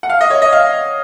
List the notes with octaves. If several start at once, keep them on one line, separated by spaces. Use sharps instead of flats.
F#5
F5
D#5
C#5
D#5
F5